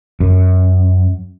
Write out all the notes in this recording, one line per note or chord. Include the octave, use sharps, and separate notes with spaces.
F#2